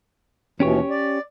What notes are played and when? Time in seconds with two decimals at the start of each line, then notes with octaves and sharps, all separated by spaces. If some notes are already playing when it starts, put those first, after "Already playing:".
0.60 D#2 B2 E3 C#4 G4 C#5
0.90 D5